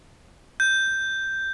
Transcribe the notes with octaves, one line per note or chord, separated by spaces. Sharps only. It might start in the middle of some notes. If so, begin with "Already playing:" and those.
G6